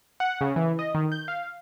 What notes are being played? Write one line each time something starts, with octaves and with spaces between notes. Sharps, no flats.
F#5
C#3
E3
D#5
D#3
G6
F5